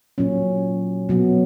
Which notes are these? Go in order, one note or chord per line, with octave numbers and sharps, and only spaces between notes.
A#2 F#3 C#4
B2 F#3 B3